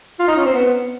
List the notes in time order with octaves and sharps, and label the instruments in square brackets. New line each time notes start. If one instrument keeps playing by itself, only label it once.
[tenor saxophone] F4
D#4
C#4
C4
B3